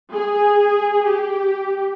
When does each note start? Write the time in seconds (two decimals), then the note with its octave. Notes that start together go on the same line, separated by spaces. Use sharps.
0.13 G#4
1.06 G4